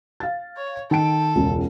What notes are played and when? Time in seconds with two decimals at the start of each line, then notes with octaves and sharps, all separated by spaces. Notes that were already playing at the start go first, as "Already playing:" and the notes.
0.20 F5 A6
0.57 C#5
0.91 D#3 A4 G5 D7
1.35 E1 C#2